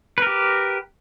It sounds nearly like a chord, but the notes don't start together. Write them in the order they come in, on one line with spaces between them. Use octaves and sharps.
B4 A#4 G4